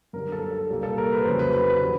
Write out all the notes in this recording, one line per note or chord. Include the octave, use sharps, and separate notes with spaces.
F#2 D3 G3 A#4
A4
A4
C2 A#2 G3 A#3
A4
A#4
B4
F2 C#3 F#3 C5
B4
B4
B4
D3 G3